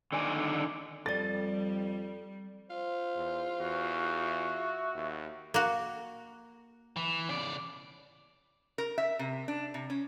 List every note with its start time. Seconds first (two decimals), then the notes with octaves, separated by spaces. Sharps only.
0.12 D3 D#3 D5 G#5
1.06 F2 G3 A4 D5 A6
2.70 F4 C5
3.16 E2
3.61 E2 F#4
4.10 E5
4.95 D#2
5.54 A#3 F#4
6.96 E3
7.29 C#3 D5
8.78 A#4
8.98 E5
9.19 C3
9.48 D4
9.74 C3
9.90 C#4